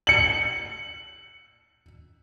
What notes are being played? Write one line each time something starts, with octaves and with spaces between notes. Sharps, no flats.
C#7 F#7